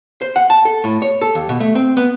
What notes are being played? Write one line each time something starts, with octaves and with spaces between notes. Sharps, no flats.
C5
F#5
A5
A4
A2
C#5
A4
D#2
B2
A3
C4
B3